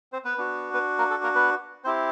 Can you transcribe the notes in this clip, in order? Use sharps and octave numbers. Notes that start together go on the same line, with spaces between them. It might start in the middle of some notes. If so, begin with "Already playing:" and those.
C4 C5
B3 B4
B3 D4 F#4
B3 B4
A#3 A#4
A4
A#3 A#4
B3 B4
C4 E4 G4 C5